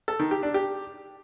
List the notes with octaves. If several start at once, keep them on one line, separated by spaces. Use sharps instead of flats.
A4
D#3
G4
D4
G4